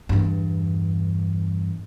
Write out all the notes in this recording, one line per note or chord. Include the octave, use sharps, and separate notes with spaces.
E2 G2